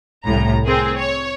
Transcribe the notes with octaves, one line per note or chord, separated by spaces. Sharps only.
C2 A2 A#5
C4 G#4 A#4
C#5